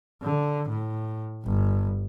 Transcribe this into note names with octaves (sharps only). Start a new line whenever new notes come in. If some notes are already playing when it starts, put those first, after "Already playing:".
D3
A2
G1